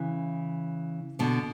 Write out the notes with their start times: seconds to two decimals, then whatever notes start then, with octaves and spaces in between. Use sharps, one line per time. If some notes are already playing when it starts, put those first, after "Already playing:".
Already playing: C#3 E3
1.19 B2 D3